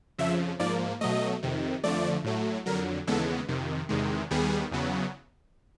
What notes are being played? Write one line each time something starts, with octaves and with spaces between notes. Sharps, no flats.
F2 C#3 F3 E5
G#2 F3 A#3 D5
B2 F#3 A3 D#5
F2 C3 D#3
F2 D3 F3 A3 D5
A2 F#3 A3
F2 D3 F#3 A#4
D#2 C#3 E3 G#3 B3 A4
F2 C3 D#3
E2 C3 D#3 G#3
D#2 D#3 G3 B3 G#4
E2 C#3 F#3 B3